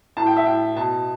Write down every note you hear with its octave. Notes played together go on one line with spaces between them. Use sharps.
A2 A5
G5
E5
A2 G5
B2 A5